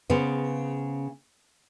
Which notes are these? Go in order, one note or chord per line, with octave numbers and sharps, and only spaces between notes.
C#3 B3 C5